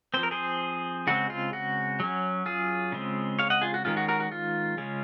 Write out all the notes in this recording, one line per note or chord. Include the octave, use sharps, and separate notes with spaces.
F3 C4 C5
A#4
G#4 C5
C#3 G#3 C4 F#4
F4
F#4
F#3 C#4
F4 G#4
C#3 G#3 C4
C#5 F5
D#5 F#5
F4 G#4
F#4
D#3 G#3 C#4 F4
F#4
F#4 A#4
F#4
F4
C#3 G#3 C#4